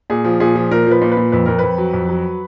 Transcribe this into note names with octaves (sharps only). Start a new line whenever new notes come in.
A#2 G#4
F3
A#2 G#4
F3
A#2 A#4
F3 B4
A#2
B4
A#2
F2 B4
F2 A#4
F2 B4
F#3
F2
F#3